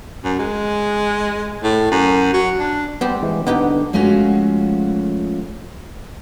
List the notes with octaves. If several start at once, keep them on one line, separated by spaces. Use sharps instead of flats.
F#2
G#3
A2
F#2
F#3
D4
G3 B3 C4 G4
E3 G#3
D3 B3 D#4 G4 B4
F3 G#3 A3 C#4 F4 F#4